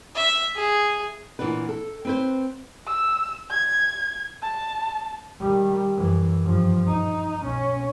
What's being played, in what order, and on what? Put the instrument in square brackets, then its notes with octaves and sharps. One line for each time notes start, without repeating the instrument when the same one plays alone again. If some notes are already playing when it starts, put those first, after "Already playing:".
[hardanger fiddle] E5
G#4
[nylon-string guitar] A#2 E3 B3 D4 B4
A4
C4 B4 C5
[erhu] E6
G#6
A5
[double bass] D#3 G3
F#2 E3
G2 F3
D#4
B1 C#4